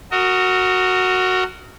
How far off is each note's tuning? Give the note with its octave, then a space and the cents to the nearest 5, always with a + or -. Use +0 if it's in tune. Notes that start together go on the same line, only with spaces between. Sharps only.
F#4 +0 A#4 -20 D#5 +35